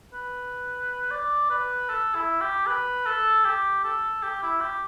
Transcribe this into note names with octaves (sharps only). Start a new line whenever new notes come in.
B4
D5
B4
A4
E4
G4
B4
A4
G4
A4
G4
E4
G4